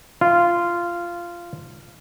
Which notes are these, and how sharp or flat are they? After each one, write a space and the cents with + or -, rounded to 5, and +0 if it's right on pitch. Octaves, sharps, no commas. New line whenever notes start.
F4 -15